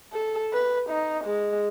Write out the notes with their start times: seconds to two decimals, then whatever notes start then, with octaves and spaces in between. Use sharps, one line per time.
0.13 A4
0.53 B4
0.90 D#4
1.24 G#3